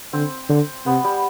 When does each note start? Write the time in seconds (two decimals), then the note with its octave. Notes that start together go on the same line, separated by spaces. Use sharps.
0.13 D3 C4
0.49 D3
0.86 C3 B3
1.04 G3